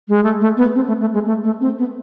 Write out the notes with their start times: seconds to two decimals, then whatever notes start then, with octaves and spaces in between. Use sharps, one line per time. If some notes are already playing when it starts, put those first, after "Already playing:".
0.09 G#3
0.24 A3
0.41 A3
0.57 B3
0.75 C4
0.88 A3
1.01 A3
1.14 G#3
1.27 A3
1.44 A3
1.61 C4
1.78 B3